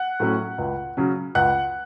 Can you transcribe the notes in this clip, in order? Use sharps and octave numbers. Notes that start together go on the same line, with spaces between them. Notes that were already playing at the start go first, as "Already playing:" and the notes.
Already playing: F#5 F#6
A2 F#3 A3 C#4
C#2
C#3 F#3 C#4
C#2 F#5 F#6